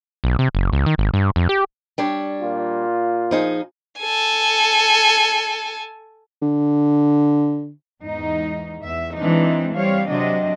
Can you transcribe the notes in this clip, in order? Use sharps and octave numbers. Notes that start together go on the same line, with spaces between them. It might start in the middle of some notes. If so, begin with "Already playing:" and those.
B1
C3
F#1
C#2
D#3
G#1
G2
F2
G4
G3 D4 C#5
A#2 F4
F3 D#4 G#4
A4 G#5
D3
E2 G#2 D#4
E2 E5
E3 G#3 C4 D4 D#4
G3 C4 C#5 F5
C3 F#3 C4 D4 D#5